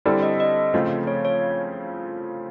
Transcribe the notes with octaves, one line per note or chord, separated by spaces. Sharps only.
D3 G3 C4 E4 A4 D5
D#5
D#5
C#3 F3 A3 C4
C#5
C#5